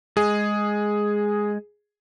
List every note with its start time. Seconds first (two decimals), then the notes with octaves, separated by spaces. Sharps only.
0.17 G#3 G#4